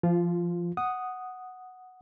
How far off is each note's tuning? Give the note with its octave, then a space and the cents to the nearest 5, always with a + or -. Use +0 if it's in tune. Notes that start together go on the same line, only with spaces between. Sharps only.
F3 -25 F4 +0
F#5 +0 D#6 +0